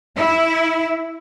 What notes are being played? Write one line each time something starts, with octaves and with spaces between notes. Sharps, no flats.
E4